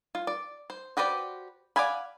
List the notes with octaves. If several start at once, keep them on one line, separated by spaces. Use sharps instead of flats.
F4
D5
C5
F#4 G4 B4 C5 D5
D5 F5 F#5 G#5 B5